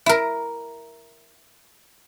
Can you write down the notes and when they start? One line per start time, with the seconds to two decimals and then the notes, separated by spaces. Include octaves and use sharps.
0.06 E4 A#4